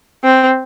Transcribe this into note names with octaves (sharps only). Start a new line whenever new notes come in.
C4